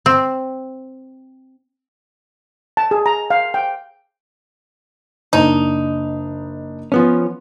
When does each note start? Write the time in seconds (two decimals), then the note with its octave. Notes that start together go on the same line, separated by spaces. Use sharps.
0.06 C4
2.77 A5
2.91 G#4
3.06 A#5
3.30 F5
3.54 G5
5.33 F#1 D4 D#4 D#5
6.92 F3 B3 C#4